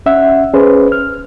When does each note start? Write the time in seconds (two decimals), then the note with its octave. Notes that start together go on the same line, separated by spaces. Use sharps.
0.06 C#4 E5 F#5
0.54 C#4 G#4 B4 C5
0.92 F6